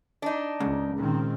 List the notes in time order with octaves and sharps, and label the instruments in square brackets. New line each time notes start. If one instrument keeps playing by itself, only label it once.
[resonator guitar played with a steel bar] D4 D#4
[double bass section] C#2 [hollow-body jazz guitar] G#2 C#3
[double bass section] A#2 D#3 C4